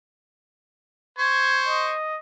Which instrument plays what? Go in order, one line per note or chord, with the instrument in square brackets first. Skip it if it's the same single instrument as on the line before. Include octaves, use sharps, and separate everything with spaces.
[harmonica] C5 C#6 [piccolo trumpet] G#6
[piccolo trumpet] D#5